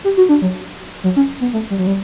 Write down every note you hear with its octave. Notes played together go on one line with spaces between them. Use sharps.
G4
F#4
D4
F#3
F#3
C#4
B3
A3
G3
F#3
G3